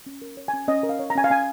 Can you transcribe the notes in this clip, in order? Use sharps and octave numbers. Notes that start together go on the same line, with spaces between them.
C#4
A#4
C#5
C#4 G#5
C#4 D#5
A#4
F5
C#5
A#5
C#4 G#5
F5
C#4 G#5